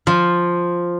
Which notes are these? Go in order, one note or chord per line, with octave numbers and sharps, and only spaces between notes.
F3